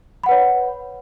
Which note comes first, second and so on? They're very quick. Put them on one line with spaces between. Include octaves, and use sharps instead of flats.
B5 F#5 B4 C#5